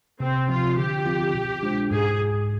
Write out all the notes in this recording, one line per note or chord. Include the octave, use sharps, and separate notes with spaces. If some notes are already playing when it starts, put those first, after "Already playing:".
C3 C4
F3 C4 F4
D3 G4
F3 C4 F4
B2
G#3 D4 F4 C5
G#2 G#4